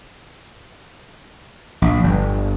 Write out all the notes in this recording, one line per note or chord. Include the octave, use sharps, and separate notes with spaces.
A#1
G1